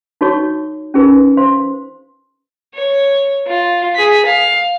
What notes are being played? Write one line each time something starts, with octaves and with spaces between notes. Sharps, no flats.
D#4 F#4 A4 C#5 C#6
C#4 D#4 F4 G#4 A#4 B4
C5 F5 C6
C#5
F4
G#4 B6
F5